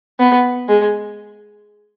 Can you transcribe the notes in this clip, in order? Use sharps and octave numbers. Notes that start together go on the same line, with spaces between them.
B3
G#3